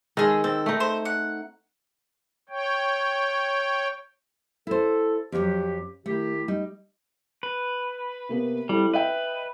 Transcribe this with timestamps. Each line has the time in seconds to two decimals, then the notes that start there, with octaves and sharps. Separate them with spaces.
0.17 D#3 G#3 G#4 A4
0.44 C4 A4
0.66 A3 D#4
0.80 C5
1.05 F#5
2.49 C#5 G5
4.67 E4 A4 C5
5.32 F2 D#3 F#3 G4
6.06 D#3 A3 E4 G4
6.48 G3 D#4
7.43 B4
8.29 C3 A#3 B3
8.69 G3 C4 E4 A4
8.94 B4 D#5 E5 G5